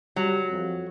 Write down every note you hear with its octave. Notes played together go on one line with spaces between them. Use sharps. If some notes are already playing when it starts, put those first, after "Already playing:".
F#3 G3
F2